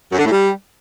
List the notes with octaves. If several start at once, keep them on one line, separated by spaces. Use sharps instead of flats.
F#2
D3
A2
G3